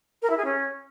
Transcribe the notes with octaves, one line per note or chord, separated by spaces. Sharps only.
A#4
E4
G#4
C#4